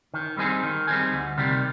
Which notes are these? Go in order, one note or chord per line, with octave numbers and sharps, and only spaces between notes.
D#3
G3 C4 D#4 G#4
D#3
G3 C4 D#4 G#4
D2
C3 D#3 G3